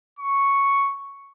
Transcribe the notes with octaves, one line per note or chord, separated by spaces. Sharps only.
C#6